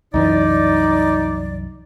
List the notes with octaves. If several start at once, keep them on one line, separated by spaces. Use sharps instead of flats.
C2 F#2 E3 D#4 D5